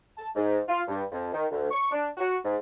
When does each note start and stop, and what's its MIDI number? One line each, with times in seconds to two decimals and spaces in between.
0.17 0.29 81
0.36 0.58 44
0.69 0.81 65
0.88 1.03 43
1.12 1.31 41
1.34 1.45 51
1.51 1.68 38
1.71 1.91 85
1.92 2.08 62
2.17 2.36 66
2.44 2.56 44